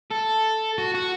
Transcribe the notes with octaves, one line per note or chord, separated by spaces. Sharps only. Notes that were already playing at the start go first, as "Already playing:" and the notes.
A4
F#4
F#4